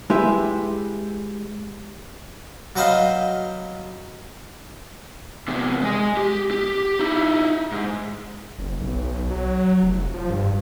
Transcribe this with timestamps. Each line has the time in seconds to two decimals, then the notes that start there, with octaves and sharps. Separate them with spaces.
0.10 G#3 E4 G4 B4 E5
2.76 F#3 F#4 B4 C5 D#5 F5
5.48 E2 C3
5.83 G#3 G#5
6.17 G4
6.51 G4
6.99 D#4 E4
7.72 G#2
8.59 F#1
8.81 B1
9.31 F#3
9.82 F1
10.14 F3
10.30 G2